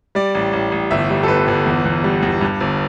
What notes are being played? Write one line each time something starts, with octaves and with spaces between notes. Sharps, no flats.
G3 D5
A1
A1
A1
G1 E5
G3
A4
G1 B4
G1
E2
E2
G3
E2
G2
G1